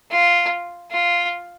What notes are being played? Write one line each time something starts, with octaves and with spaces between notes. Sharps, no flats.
F4
F4